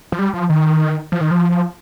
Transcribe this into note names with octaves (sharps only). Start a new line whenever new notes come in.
F3
G3
F3
D#3
F3
D#3
F3